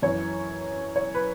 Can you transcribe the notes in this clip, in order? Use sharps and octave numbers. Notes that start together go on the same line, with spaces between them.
F#2 E3 C#5
C#5
B4